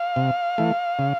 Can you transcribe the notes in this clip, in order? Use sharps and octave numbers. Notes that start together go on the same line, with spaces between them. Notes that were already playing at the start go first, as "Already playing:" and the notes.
Already playing: F5
C3
E3 A3
C#3